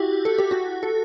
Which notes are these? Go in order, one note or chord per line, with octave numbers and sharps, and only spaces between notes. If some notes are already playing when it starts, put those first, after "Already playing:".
Already playing: E4 F#4 G4
A4
G4
F#4
A4